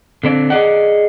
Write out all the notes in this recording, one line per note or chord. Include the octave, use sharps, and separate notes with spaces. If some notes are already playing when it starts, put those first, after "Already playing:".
D3 C4 D5
G#4 D5 D#5 F#5